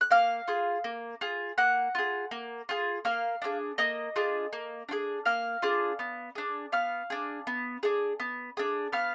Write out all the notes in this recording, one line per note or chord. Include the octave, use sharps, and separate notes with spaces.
F#6
A#3 F5 F6
F4 G#4
A#3
F4 G#4
A#3 F#5 F#6
F4 G#4
A#3
F4 G#4
A#3 F5 F6
D4 F4 G#4
A#3 D#5 D#6
D4 F4 G#4
A#3
D4 F4 G#4
A#3 F5 F6
D4 F4 G#4
B3
D4 G#4
B3 F5 F6
D4 G#4
B3
D4 G#4
B3
D4 G#4
B3 F5 F6